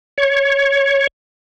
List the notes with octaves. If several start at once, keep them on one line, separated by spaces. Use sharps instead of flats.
C#5